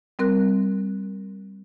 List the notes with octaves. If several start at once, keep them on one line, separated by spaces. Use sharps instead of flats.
G3 C4 A#4 F#6